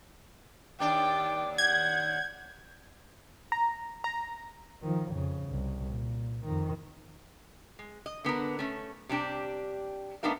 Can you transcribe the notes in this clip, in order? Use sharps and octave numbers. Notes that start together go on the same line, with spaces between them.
D#2 D4 G5 D6
F#5 G6 G#6
A#5
A#5
D#3 F3
F2 C#3
C2
A#2
F2 D#3
G#3
D#5
D3 B3 D4 A#4
A3 C#4
C3 G3 D4 G4
A3 B3 D4 D#4 A#4 F5